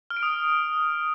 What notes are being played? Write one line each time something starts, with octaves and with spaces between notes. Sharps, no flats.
F6
D7
D#6